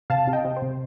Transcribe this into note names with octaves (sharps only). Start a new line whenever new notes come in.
C3 F5 A5
C3
D#5 G5
C3
C5
C3